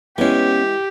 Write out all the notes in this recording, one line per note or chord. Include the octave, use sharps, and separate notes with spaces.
E3 G#3 B3 C#4 G4